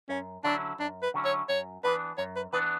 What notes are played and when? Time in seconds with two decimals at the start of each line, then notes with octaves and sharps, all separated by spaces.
0.09 F#2 C#4
0.44 D3 F#3 C#4 D4 E4
0.79 F#2 D4
1.03 B4
1.14 D3 F#3 C#4 E4
1.25 C#5
1.49 F#2 C#5
1.84 E3 B3 D4 B4
2.18 F#2 C#5
2.36 B4
2.53 E3 B3 D4 B4